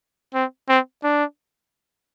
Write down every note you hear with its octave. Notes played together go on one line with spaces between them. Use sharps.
C4
C4
D4